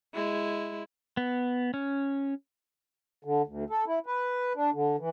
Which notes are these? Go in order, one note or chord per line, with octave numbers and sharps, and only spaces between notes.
G#3 E4
B3
C#4
D3
D2
A4
E4
B4
D4
D3
E3